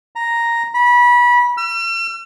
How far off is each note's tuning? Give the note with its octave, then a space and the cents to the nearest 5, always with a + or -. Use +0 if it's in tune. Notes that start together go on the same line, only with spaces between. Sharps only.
A#5 +0
B5 -25
E6 +45